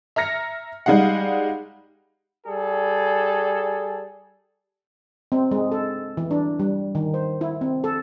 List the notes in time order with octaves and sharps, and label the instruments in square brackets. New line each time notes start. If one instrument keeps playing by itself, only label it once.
[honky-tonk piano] E5 A#5 F6 A#6 C#7
G3 G#3 D#4 F5 F#5
[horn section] G3 G#4 A4
[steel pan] C4
G#3
A4
E3
D4
G3
D#3
C5
E4
C4
A4